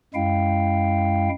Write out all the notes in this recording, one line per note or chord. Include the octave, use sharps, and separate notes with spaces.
F#2 G#3 E4 F5 G5